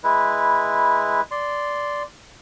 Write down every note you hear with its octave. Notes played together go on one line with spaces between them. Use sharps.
G#3 E4 B4
D5 C6